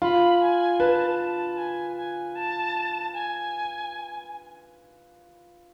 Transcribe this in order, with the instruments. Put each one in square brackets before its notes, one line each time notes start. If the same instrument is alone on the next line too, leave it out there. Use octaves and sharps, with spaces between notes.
[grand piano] F4 [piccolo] B5
[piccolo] G#5
[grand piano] B4 [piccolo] A5
[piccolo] A5
G#5
G#5
A5
G#5